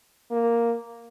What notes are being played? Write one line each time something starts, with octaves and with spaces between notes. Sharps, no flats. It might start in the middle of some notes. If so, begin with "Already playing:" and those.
A#3